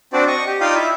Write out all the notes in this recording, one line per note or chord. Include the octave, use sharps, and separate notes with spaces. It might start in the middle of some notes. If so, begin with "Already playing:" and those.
C4 D4 F#4 C5 D5
D#5 C#6
G4
D#4 F4 D5 F5 G5 D#6
E4 E5